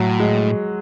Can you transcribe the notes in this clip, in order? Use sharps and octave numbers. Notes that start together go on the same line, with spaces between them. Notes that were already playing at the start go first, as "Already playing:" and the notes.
Already playing: A2 F#3
G#3